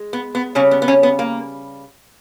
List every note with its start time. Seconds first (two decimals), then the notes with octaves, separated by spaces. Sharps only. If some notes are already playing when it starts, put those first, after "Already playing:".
Already playing: G#3
0.13 B3
0.35 B3
0.55 C#3 G3 C#4
0.71 B3
0.82 B3
0.88 C#4
1.03 B3
1.19 A#3